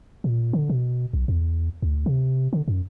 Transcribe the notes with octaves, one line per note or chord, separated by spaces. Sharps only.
A#2
D3
B2
B1
E2
D2
C3
D3
F#2